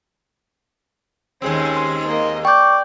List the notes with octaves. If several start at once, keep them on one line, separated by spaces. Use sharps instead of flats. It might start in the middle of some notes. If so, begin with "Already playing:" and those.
D#2 G#3 C4 C#4 G#4
C6
A#3 D#5
D5 G5 C#6 D6 G6